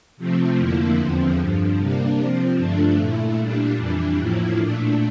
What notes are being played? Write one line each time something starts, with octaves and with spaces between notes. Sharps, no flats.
C3 F3 A3 C4
F2 D3 F3 A#3 E4
E2 D3 F3 C4
G2 D3 F3
C3 G3 A#3 D4
C3 F3 C4
G2 D3 F3 A3 D4
A#2 A3 E4
A#2 G3 D4
F2 E3 G3 D4
A2 F3 A#3 E4
A#2 A3 D4